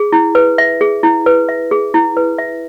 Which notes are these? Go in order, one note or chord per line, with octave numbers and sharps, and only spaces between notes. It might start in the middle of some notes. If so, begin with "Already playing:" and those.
Already playing: G#4
E4
B4
E5
G#4
E4
B4
E5
G#4
E4
B4
E5